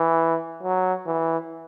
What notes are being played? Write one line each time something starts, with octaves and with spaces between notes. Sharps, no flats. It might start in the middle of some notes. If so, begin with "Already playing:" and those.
Already playing: E3
F#3
E3